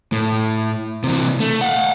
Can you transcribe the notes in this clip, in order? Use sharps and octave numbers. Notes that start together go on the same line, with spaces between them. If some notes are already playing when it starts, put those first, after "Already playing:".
A2
C3 E3
A3
F5 F#5